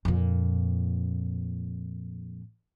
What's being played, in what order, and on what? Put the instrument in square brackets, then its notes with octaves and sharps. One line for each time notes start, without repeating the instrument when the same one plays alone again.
[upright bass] F2 A#2